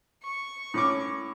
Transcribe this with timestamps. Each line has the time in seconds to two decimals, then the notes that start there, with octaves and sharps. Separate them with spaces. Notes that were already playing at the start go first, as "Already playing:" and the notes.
0.23 C#6
0.74 A2 C#4 D6